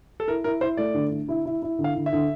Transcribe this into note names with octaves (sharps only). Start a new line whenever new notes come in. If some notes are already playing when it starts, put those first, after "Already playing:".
A4
E4 A#4
E4 A#4
E4 C5
A3 D5
D3
D3
E4
E4
E4
D3
F5
D3
E5
D3